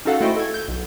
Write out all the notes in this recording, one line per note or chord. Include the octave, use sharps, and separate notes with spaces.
C#4 D#4 F#4 A4 F5 F#5
A3 E4 F#4 C5 D#5 G5
A4 G#6
G6
B1